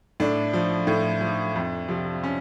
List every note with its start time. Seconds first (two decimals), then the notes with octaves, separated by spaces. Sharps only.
0.20 A2 D4
0.53 F3
0.87 A2
1.21 F3
1.56 F2
1.88 C3 F3
2.23 C#4